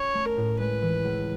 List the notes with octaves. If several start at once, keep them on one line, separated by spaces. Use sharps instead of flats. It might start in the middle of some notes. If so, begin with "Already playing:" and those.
Already playing: C#4 C#5
A3
A#4
A2
G#3 B4
E3
C#2